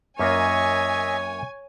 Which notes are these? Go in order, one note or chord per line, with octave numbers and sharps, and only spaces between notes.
F#2 A#3 F4 C#5 D#5 E5 G#5 C#6